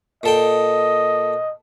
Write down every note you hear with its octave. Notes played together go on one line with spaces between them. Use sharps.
A#2 A4 D#5 G5